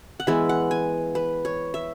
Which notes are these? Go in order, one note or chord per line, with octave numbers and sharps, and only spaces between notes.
F#5
E3 G#3 B3 E5
F#5
G#5
B4
C#5
E5